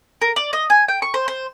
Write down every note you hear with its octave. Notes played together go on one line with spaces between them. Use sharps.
A#4
D5
D#5
G#5
G5
C#6
C5
C5